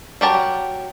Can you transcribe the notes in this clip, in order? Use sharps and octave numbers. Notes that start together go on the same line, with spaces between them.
F#3 F#4 G4 A#4 A5